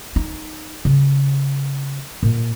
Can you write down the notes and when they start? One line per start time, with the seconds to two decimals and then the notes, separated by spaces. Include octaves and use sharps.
0.16 D#4
0.85 C#3
2.23 A#2